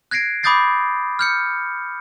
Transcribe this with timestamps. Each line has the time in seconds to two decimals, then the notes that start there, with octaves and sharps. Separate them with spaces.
0.11 F#6 G#6 A#6 C7 D7
0.43 B5 D6 D#6 G6 A6 C7
1.19 F6 G6 C#7